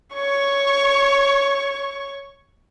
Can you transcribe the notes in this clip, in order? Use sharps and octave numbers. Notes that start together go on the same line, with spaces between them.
C#5 C#6